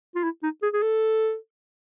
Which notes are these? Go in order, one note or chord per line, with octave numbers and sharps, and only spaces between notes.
F4
E4
D#4
G#4
G#4
A4